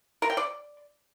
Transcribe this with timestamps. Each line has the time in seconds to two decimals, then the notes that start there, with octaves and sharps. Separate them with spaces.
0.22 A#4
0.30 G5
0.37 D5